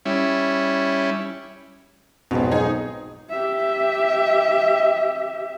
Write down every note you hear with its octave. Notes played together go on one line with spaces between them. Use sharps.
G3 C#4 E4
B1 F2 G#2 B2
D#4 G#4
G4 E5